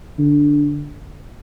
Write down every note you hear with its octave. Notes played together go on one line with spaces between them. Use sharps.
D3